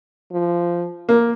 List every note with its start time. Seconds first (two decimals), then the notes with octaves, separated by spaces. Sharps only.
0.32 F3
1.09 A#3